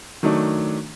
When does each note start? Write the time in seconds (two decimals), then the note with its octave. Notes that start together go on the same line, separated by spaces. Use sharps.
0.23 D#3 F#3 A3 D4